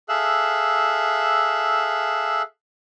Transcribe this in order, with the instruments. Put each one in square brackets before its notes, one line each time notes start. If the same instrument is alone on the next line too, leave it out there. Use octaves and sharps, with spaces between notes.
[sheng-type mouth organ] G#4 A4 E5 F5 E6 F#6